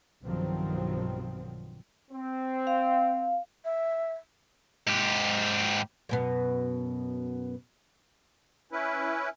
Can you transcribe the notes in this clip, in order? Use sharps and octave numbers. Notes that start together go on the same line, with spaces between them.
B1 G2 D#3 F3 F#3 C4
C4
F5
E5
G#2 G4
F#2 B2 B3
C#4 E4 B4